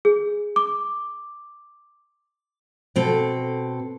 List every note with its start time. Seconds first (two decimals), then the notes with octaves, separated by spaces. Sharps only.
0.05 G#4
0.56 D6
2.96 B2 C4 A4